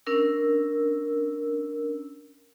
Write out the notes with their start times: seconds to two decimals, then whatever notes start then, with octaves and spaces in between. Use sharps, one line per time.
0.06 C#4 D4 A#4 E6